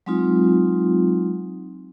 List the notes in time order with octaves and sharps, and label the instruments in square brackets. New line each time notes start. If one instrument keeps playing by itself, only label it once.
[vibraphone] F#3 G#3 C4 D#4 F4